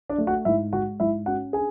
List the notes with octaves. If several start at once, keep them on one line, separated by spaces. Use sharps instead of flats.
D4 D5
A3
F#4 F#5
G#2 E4 E5
G#3 F#4 F#5
G#2 E4 E5
C#4 F#4 F#5
D4 G#4 G#5